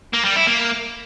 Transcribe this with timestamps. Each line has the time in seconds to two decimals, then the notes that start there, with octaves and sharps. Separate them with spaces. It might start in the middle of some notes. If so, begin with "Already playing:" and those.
0.13 A#3
0.24 G3
0.36 E4
0.47 A#3